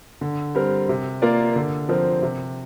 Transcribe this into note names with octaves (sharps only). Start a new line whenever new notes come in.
D3
G3 C4 A#4
C3
A#3 F4 A#4 D5
D3
F3 C4 A#4
C3